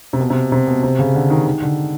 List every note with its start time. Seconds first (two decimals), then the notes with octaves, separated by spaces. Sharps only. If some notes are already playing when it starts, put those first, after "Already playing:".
0.13 C3
0.20 B2
0.30 C3
0.52 C3
0.67 B2
0.83 C3
0.99 C#3
1.15 D3
1.30 D#3
1.46 D#3
1.62 D3